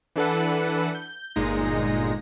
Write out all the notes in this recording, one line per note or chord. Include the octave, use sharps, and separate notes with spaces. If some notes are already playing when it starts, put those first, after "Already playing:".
E3 D4 A4 B4 F#5
G6
G1 A#2 G#3 D#4 A#6